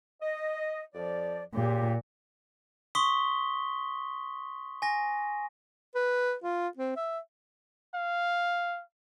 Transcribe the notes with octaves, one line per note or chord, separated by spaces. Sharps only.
D#5
F2 F3 D5
A#2 C#3 F4 G4
C6 C#6 D#6 B6 G7
G#5 A#6
B4
F4
C4
E5
F5